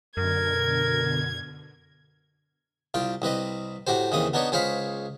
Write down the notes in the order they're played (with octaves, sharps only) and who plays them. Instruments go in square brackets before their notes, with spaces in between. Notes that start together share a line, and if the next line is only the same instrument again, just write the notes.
[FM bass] F#2 [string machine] B2 D3 [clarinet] A#4 [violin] G#6
[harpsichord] C2 F4 G5
C2 C4 B4 D#5
A2 F#4 G4 C5
D#2 C#3 E3 C4 D#6
B3 D4 D#4 B4 C#5
C#2 G#4 C5 C#5 F5 B5